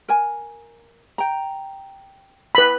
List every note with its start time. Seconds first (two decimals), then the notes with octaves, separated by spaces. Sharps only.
0.08 A#4 G#5
1.18 G5 A#5
2.55 B4 B5